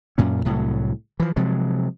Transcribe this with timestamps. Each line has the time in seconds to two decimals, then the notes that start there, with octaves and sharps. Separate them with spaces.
0.18 F#2 A#2 C#4
0.45 C2 A2 F#3
1.20 E3 F3
1.36 C3 F3 F#3 G#3